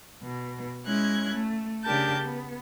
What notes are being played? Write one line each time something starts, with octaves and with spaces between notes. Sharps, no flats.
B2
G#3 C#4 E4 F#6 G#6
A3
C#3 D4 G4 A#4 A5 G6
B3